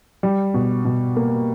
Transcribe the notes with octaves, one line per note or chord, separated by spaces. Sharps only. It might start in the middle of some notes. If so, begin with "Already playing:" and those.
G3
B2
B2
A#3